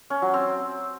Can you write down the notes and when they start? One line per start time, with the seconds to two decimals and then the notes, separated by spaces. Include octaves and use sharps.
0.10 C#4
0.22 F#3
0.34 C4